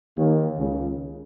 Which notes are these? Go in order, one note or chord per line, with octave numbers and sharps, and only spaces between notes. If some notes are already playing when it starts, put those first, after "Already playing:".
D#2 D#3
C#2 C#3